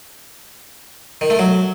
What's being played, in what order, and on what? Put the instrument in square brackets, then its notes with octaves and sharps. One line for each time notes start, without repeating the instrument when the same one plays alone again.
[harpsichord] D#3
A3
F#3